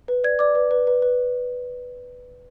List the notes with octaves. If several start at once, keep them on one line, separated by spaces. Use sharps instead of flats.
B4
D5 G#6
D5 D6
B4
B4
B4
B4